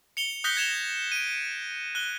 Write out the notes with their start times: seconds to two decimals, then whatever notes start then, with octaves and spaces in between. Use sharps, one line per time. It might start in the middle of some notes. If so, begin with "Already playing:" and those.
0.17 C#7 F7 G7
0.44 D#6 F#6 G6 A#6 B6 G7
0.57 G#6 A#6 E7 F7 G7
1.12 D7 D#7
1.95 F#6 G7